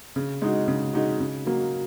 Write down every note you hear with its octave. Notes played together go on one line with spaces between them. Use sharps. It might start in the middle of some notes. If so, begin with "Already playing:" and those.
C#3
G#3 D#4 F#4
C#3
G#3 D#4 F#4
C#3
F#3 A#3